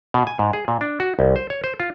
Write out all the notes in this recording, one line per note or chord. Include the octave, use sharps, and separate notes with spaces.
B2
G#5
G#2
G#4
A#2
D4
F#4
C2
C5
C#5
C5
F4